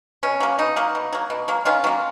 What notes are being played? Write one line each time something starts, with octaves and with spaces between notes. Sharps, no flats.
B2 C#4
F#3 A#3
B2 D#4
F#3 A#3
B2
F#3 A#3
B2
F#3 A#3
D#3 C#4 F4
F#3 A#3